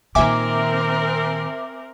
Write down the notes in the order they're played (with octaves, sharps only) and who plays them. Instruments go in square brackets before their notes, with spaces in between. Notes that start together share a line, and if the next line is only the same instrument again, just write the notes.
[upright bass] A#2 D#3 [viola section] C4 A#4 [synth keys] E5 G#5 D6